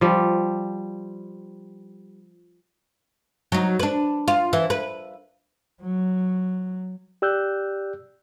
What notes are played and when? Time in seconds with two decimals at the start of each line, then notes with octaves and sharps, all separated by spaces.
0.01 F3 G3
3.52 F#3 D#4
3.79 D4 B4
4.28 F4
4.53 E3
4.70 B4
5.82 F#3
7.22 G4 D5 E6 F#6 G6